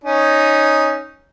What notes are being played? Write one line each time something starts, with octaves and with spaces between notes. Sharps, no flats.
C#4 D#4